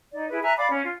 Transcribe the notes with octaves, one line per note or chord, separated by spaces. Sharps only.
D#4 D5
E4 G#4 B4
E5 G#5 A#5 F#6
D5 F5 B5 D6
C#4
F4